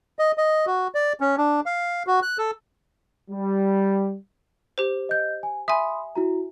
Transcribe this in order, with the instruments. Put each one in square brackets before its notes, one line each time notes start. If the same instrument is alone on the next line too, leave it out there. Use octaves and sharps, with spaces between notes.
[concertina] D#5
D#5
F#4
D5
C#4
D4
F5
F#4
F#6
A4
[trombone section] G3
[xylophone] G4 C5
[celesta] D#5 G6
G#5
[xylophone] E5 G#5 [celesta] B5 C6 D#6
[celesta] E4 F#4 A#5